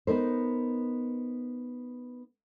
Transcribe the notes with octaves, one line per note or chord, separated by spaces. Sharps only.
B3 D#4 A#4 C5